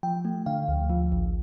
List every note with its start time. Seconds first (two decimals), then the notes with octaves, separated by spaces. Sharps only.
0.03 F3 G5
0.25 A3
0.46 D3 F5
0.68 D2
0.90 F3
1.12 A1